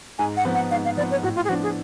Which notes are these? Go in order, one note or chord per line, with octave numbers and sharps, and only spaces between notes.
G#2 G#5
F#5
F3 B3
F#5
G#2 F5
F5
F3 B3 D5
C#5
A2 F#4
F4
G#4
F3 B3 D4 F#4
G#4